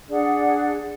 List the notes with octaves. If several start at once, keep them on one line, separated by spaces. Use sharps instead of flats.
D4 G#4 D5 F#5